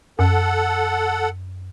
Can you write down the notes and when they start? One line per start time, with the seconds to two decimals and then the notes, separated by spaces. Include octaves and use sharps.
0.19 F#2 A4 F#5